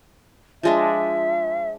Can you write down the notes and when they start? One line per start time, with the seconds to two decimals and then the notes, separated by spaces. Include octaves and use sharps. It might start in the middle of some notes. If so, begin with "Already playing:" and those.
0.63 F3 G#3 D4 E5